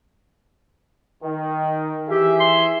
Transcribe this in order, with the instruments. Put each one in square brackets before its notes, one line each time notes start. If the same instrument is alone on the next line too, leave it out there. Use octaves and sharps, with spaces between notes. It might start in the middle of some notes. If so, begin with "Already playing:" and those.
[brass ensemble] D#3
[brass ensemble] E3 G#4 E5 [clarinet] G4
[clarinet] C6